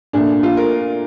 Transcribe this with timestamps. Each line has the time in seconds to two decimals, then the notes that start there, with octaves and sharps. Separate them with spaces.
0.13 A#2 A3 D4
0.43 F4
0.57 A#4